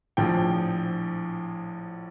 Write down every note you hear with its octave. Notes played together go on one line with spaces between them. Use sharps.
A#1 A2 F3 G5